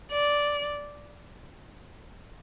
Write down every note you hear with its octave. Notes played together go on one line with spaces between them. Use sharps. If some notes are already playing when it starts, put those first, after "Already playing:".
D5